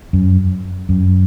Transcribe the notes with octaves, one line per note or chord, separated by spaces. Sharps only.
F#2
F#2